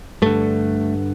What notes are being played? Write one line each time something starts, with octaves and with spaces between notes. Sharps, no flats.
G2 D3 A3